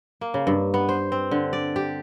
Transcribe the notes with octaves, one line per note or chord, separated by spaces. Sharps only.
A#3
C#3
G2
B3
C5
C4
D3
D5
G4